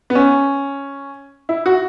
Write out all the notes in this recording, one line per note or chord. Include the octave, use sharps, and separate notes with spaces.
B3
C#4
E4
F#4